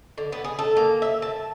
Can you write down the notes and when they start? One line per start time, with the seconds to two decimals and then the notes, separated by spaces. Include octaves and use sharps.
0.18 D3
0.32 B3
0.44 G#4
0.59 A4
0.77 A#3
1.02 E5
1.22 A5